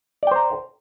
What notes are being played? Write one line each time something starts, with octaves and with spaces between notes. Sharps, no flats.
C5 D5 G5 A#5